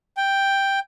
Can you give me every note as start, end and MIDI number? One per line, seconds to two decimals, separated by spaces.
0.17 0.79 79